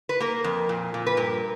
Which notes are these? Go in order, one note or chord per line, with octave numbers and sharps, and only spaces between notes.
B4
A#3 A#4
F2
A#2
A#2
B4
G2 A#4